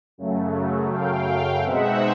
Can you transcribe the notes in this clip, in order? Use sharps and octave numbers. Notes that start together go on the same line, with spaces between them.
F#2 C#3 F#3 A3
F5 G5
B2 G#3 C4 D#4 E5 F#5